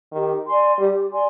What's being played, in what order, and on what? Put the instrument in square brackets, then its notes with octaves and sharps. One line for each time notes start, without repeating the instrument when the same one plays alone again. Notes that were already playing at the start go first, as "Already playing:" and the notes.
[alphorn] D#3 [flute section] G4
[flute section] D5 G#5 C6
[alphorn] G3 [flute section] G4
[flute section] D5 G#5 C6